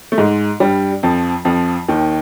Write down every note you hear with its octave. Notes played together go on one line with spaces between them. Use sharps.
A3
G#2 G#3
G2 G3
F2 F3
F2 F3
D#2 D#3